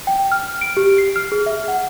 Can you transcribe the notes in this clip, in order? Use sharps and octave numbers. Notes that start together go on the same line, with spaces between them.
G5
F6
D7
G4
C7
F6
G#4
E5
F#5